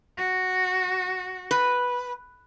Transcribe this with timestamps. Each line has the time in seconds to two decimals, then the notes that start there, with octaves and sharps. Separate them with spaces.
0.18 F#4
1.51 B4